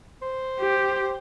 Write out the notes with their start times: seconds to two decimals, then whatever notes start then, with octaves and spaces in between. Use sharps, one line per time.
0.22 C5
0.59 G4